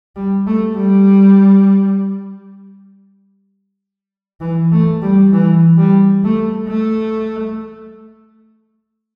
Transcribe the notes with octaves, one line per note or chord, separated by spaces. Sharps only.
G3
A3
G3
E3
A3
G3
E3
G3
A3
A3